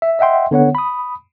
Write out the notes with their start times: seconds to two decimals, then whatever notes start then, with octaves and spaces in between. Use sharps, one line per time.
0.02 E5
0.19 D#5 E5 F#5 G5 C6
0.51 D3 B3 C#5 F#5
0.75 B5 D#6